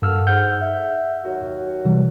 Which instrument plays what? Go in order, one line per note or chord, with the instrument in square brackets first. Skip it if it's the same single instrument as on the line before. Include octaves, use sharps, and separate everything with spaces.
[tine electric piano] G2 E6 F6 [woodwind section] A#3 F#4 A4
[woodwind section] G#2 [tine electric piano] F#5 F6 G6
[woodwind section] E5
D#2 F#3 F#4
[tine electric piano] C3 E3 G3